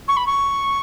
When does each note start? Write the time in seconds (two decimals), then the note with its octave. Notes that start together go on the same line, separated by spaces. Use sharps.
0.08 C#6
0.17 B5
0.26 C#6